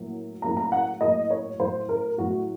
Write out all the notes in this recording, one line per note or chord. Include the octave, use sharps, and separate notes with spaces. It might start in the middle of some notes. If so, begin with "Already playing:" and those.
Already playing: A2 F#3 A#3
A2 F#3 A#3 A#5
A#5
F#5
A2 F#3 A#3 D#5
C#5
A2 F#3 A3 C5
A#4
A2 F#3 A3 F#4